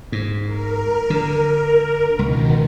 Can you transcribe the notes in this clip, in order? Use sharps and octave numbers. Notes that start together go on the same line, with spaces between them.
G#2
A#4
D3
C#2 B2 D#3